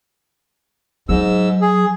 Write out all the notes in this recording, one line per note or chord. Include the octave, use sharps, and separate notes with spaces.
G#2 F#3 E6
G#4